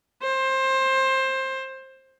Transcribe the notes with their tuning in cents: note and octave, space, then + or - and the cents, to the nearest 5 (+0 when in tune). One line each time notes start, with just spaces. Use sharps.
C5 +20